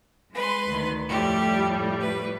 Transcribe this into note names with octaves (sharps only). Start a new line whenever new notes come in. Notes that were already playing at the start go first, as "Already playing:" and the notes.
G#3 B4 C6
D2 D#3
F2 A2 G3 G4
B4